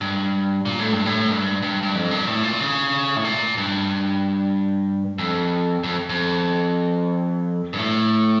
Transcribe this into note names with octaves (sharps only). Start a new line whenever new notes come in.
G2
A#2
A2
G2
A2
G2
G2
G2
F2
G2
A2
A#2
C#3
A2
A#2
G2
F2
F2
F2
G2
A2